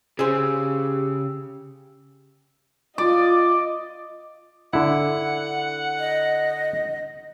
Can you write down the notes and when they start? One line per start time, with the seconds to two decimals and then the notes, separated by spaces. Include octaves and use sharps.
0.19 C#3 G4 G#4 C5 E6
2.98 F4 D5 D#5
4.73 D3 E4 F#5
5.99 D#5